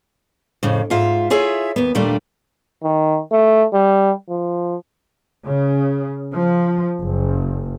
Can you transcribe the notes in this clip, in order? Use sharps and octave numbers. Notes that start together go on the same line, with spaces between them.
F2 A2 C#3
G#2 F4 E5
E4 F4 G#4 C#5 E5
D#2 B3
D#2 A#2 G3 A3 D4
D#3
A3
G3
F3
C#3
F3
F#1